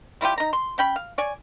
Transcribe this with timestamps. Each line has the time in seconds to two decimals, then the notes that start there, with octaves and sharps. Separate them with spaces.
0.21 G3 E4 F4 G4
0.38 D#4 A#5
0.53 C6
0.78 C#4 G5 B5
0.96 F5
1.18 C#5 D5 G#5